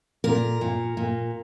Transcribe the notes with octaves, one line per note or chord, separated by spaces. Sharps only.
A#2 A#4
A#2
A#2